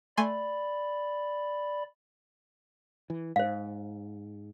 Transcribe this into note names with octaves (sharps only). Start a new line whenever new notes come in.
A3 D5 G#5 B5 C6
E3
G#2 C5 F5